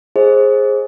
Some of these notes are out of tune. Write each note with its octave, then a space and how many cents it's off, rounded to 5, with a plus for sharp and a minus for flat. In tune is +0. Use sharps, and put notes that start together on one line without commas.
G#4 +0 C5 +25 D#5 +15